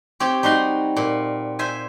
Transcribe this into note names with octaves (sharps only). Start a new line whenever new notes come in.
C4 G4 C#5
G3 D#4 F#4 C6
A#2
C5 E5 G#5